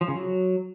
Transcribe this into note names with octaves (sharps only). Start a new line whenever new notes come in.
F3
C#3
F#3